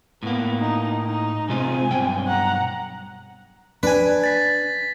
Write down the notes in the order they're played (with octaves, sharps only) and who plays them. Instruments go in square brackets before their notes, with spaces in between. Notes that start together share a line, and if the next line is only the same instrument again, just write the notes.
[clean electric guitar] A2 A#3 [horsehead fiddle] B3
[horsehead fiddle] D#4
D#4
[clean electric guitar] C3 G#3 F4 [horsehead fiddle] C4 G#5
[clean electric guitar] B1 G2 G5
[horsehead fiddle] F#5 A#5
[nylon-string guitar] D4 [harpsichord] B4 G#5
[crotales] A6 B6